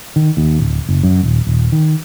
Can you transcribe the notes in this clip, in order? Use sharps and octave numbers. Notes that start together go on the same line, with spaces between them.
D#3
D#2
D1
F#1
F#2
D#1
D#1
D#3